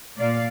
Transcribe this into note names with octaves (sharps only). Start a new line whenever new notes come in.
A#2 D5 F5